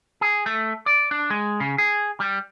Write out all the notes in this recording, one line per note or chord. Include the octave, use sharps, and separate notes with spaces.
G#4
A3
D5
D4
G#3
C#3
G#4
G3